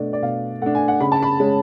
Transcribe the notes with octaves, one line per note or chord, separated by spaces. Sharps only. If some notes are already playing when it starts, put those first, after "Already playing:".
Already playing: B2 A3 D4 D5
D5
B2 F5
A3 D4 F#5
G#5
F#5
C#3 B5
A5
B5
G#3 C#4